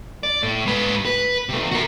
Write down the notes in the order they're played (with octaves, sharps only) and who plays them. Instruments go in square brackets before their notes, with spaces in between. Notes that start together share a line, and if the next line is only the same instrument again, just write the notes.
[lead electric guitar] D5
A2
G#2 B4
B4
C3 A3
F#4 A#4